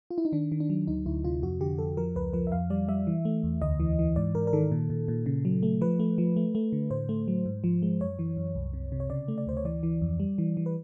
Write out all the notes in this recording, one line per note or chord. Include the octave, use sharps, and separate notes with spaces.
F4
E4
D#4
D#3 D4
D#3
D4
F#3
D2 D#4
D2 E4
C3 F4
F2 F#4
D3 G4
F2 A4
F3 A#4
C#2 B4
F3 B4
E5
F2 F5
G3 D5
G3 E5
E3
A3
E2
D2 D#5
E3
E3
G#2 D5
G#2 A#4
A#4
D#3 A4
A#2
A#2
A#2
C#3
F#3
A3
F3 B4
A3
F3
A3
A3
D3
A2 C5
A3
F#3
G#2
F3
G#3
F#2 C#5
E3
F#2
C2
C3
C3
C#5
C#3 D5
A3
D5
D2 C5
C#5
E3 D5
E3
F2
G3
E3
E3
B4